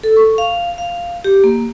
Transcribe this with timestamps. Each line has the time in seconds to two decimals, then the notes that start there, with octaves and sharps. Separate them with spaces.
0.03 A4
0.17 C#6
0.38 F5
0.78 F5
1.24 G4
1.44 A#3